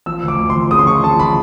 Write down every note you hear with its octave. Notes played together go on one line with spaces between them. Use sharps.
F3 E6
D2
D6
D2
C6
F3
C#3 D#6
C6
F3 C#6
F3 A5
F3 B5